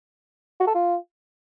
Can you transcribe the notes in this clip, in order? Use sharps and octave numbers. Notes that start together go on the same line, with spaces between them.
F#4
A4
F4